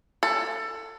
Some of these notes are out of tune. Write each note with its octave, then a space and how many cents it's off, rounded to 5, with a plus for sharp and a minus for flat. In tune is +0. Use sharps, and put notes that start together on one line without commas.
A4 +20